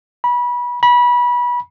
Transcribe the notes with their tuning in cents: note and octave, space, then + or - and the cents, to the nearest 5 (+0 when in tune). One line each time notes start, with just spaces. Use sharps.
B5 -25
B5 -25